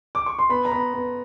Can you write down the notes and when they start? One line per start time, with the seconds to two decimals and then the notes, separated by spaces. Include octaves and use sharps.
0.15 D6
0.26 C#6
0.39 C6
0.49 B3 B5
0.65 A#5
0.72 B3 B5
0.94 B3